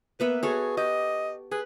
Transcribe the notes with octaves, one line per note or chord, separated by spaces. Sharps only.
A#3 B3 B4 E5
F#4 G#4 A4 C#5
G4 D#5
G#4 B4